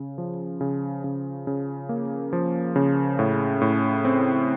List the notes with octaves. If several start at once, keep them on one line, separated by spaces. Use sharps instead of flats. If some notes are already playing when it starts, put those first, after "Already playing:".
Already playing: C#3
F3
C#3
C#3
C#3
A#3
F3
C#3
A2
A2
C4